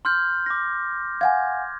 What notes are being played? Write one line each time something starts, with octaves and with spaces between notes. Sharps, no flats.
C6 F6 G6
D6 A#6
F5 F#5 G#5 G#6